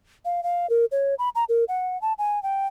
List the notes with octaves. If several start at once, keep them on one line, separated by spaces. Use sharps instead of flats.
F5
F5
A#4
C#5
B5
A#5
A#4
F#5
A5
G#5
G5